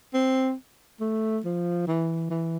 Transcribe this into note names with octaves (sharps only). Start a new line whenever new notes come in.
C4
A3
F3
E3
E3